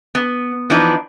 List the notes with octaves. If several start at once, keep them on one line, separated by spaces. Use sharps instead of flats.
B3
E3 F3 B3 D4 D#4 B4